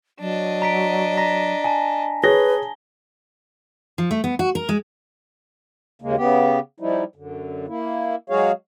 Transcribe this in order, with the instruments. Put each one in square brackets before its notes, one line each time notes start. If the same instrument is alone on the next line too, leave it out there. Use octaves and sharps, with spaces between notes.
[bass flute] F#3 [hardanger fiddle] D4 D#5
[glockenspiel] A#5 B6 D7
A#5 A#6 B6
G#5 A5
[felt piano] G#4 C#5 A#6 [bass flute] B4 [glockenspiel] G7
[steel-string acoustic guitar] F3
A3
B3
F#4
A#4
G#3
[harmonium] D#2 C#3 G#3 A#3
C#3 B3 G4
F3 G3 D#4 E4
F#2 D3
A#3 E4
F#3 G#3 F#4 G#4 C#5 F5